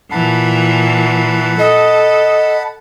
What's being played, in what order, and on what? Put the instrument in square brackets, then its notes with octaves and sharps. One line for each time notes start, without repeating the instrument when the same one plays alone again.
[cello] A#2 E3 [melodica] F#5 A5 B5
[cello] A4 [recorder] D#5